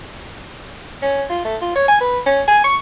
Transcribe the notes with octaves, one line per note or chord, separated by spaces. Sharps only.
C#4
F4
A3
F4
C#5
G#5
B4
C#4
G#5
C#6